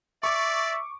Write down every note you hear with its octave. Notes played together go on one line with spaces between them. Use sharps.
D5 E5 C#6 D6